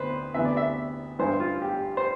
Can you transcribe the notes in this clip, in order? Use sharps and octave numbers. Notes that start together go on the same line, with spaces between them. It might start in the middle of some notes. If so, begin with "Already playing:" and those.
Already playing: D2 C3 B3 B4 C5
D2 C3 E3 B3 E5
D5
E5
A1 G2 E3 C5
F4
G4
C5